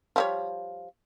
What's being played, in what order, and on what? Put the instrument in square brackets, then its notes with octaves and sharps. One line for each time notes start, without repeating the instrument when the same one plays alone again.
[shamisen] F3 G3 C#5